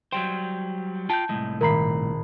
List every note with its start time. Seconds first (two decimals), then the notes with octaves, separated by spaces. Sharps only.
0.12 F#3 G3 C5 G5
1.10 F4 G5 A5 G6
1.29 C2 A2 G#3
1.61 G#1 A#2 A#4 A#5 B5 C7